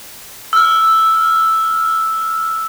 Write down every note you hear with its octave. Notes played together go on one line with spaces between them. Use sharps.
E6 F6